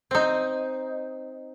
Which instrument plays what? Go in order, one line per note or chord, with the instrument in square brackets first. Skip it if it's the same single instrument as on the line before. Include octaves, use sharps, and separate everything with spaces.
[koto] C4 D#4